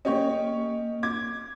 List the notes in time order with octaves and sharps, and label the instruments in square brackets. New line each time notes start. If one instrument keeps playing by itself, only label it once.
[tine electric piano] A#3 D#5 [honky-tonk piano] C#4 G4 C#5
[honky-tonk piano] D6 G#6